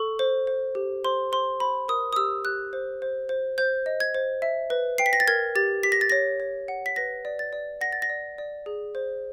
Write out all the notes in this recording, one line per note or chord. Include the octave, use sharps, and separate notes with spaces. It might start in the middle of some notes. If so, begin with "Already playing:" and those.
Already playing: A4 C#6
C5
C5
G4
C5 C6
C5 C6
C5 B5
A#4 D#6
D#6
G4 E6
G4 F#6
C5
C5
C5
C5 G6
D#5
G#6
C5
E5
B4
G5 C7
B6
A#6
A6
A#4 G#6
G4 A6
G4 B6
A#6
A6
C#5 A#6
C#5
F#5
B6
B4 A#6
D5
A6
D5
F#5 A#6
A6
A#6
D5
D5
G#4
C5